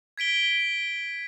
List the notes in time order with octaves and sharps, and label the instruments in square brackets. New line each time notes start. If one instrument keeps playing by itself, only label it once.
[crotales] G#6 B6 D7 G7